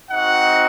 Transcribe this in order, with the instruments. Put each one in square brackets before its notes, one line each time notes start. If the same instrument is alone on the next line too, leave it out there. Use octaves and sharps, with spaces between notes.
[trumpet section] C4 D#4 F#4 F#5